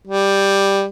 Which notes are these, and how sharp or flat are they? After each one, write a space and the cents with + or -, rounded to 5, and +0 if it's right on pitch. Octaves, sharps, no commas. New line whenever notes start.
G3 +5